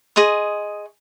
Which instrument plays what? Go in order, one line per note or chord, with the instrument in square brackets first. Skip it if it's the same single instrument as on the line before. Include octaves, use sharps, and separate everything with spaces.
[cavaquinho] G#4 D#5 C6 C#6